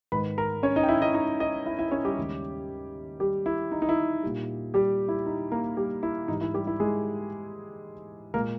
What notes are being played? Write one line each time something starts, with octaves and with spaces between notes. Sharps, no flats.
G#2 D#3 G#3 B4 B5
A#4 A#5
C#4 C#5
D#4 D#5
G5
E4 E5
D#4 D#5
D#4 D#5
D#4 D#5
E4 E5
E4 E5
C#4 C#5
G3 G4
D#2 C#3 G#3
G3 G4
E4
D#4
D#4
E4
A#2 G3
G3 G4
E4
D#4
A#3 A#4
G3 G4
E4
G#2 E3 G3 D#4
E4
G3 G4
E4
G#3 G#4
A#2 G#3 A#3 A#4